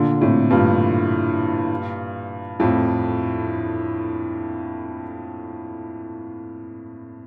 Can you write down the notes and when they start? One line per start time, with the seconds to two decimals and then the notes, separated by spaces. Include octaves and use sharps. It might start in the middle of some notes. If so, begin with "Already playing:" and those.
Already playing: A#2 D3
0.21 A2 C3
0.50 G2 A#2
2.60 F2 A2